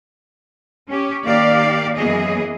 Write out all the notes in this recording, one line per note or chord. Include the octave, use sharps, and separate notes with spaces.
C#4 G4
D#3 A#3 G4 D5 F5
F#2 E3 A#3 B3 G#4 D#5